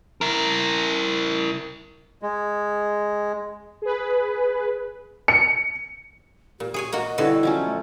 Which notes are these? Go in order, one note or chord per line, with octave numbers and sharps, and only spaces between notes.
E4 A#4
G#3
G#4 B4
C#7
A#2 G4
G#4 C#5 G#5
A#3 F#4 D#5
B2 D3 G3 E4 F#4 C#5
F3 F#3 C#4 D#5
A3